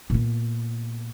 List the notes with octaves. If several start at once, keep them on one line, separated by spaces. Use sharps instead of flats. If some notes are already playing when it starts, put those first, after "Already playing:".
A#2 B3